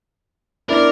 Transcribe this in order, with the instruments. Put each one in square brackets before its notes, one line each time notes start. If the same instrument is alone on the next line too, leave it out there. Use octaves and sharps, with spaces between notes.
[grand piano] B3 D4 E4 [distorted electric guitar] A#4 [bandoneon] D5